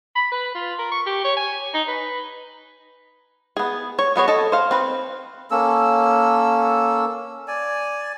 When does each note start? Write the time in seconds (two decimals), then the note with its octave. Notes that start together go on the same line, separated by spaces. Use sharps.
0.15 B5
0.32 B4
0.55 F4
0.78 A#4
0.91 C#6
1.06 G4
1.24 C#5
1.37 G#5
1.74 D#4
1.88 B4
3.57 B3 G#4
3.99 C#5
4.16 F#3 B3 G#4 C#5
4.28 A4 D#5 A5
4.52 C5 F5
4.71 C4 B4
5.51 A#3 C#4 A4 E6
7.48 D5 G#5